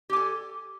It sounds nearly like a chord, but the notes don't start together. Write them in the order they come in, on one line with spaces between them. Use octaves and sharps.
G4 G#5 A4